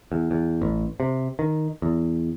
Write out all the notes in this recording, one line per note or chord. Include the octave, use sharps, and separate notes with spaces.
E2
E2
A1
C3
D#3
E2